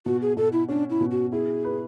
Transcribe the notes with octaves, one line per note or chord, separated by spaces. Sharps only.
B2 F#4
G#4
B2 A4
E4
C#4 D4
E4
B2
F#4
E4 G#4
B4